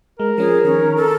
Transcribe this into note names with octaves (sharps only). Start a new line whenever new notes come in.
G#3 A#4
F3 C#4 G#4
D#3 C#4
A4